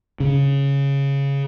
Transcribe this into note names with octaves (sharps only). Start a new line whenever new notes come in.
C#3